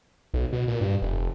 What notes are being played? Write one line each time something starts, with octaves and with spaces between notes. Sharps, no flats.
B1
B2
A#2
G2
F1